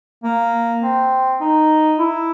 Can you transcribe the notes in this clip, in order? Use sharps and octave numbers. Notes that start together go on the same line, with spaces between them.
A#3
C4
D#4
E4